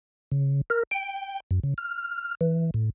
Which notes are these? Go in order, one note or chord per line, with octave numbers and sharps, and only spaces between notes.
C#3
A#4
G5
F#2
C#3
F6
E3
A2